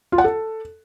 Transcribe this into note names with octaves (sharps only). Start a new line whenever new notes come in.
F4
F#5
A4